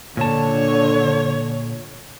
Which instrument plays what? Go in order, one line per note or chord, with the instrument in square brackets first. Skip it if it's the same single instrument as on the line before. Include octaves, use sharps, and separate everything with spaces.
[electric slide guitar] A#2 A5 [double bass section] D3 [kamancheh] C#5